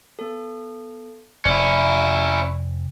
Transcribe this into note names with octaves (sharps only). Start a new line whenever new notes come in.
B3 A4
F1 C#4 E4 D5